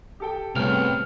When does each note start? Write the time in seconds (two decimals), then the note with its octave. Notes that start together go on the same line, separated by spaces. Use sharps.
0.20 G4 A4 G5
0.55 C2 G2 C#3 A3 B3 C4 F6 F7